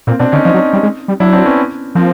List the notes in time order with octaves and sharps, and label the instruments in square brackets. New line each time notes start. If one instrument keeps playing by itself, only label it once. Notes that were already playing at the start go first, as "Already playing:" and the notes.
[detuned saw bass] A#2 [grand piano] A#3 C4
[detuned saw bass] B2 [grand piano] C4 D4
[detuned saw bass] D3 [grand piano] C#4 D#4
[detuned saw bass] F3 [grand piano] C#4 D#4
[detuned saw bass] F#3
G3
G#3
G3
[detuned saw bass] F#3 [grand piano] D4 E4
[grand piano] C4 D4
B3 C#4
[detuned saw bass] F3 [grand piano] A#3 C4